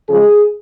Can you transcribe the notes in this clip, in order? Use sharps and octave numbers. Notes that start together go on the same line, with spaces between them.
C#3 F3 G#3 G#4